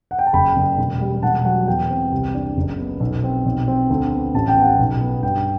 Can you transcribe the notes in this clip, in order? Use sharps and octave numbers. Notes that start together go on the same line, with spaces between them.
F#5
G5
A5
F#1 G5 B5
F#1
E1
G3
E1 F#5 A5
F#3 F#5
E2 G5
C4
C2
D4
F#1
B3
B1
C4
B1
C4
D2
B3
A1 A5
G5
B3 F#5 A5
B1
B3
G2 G5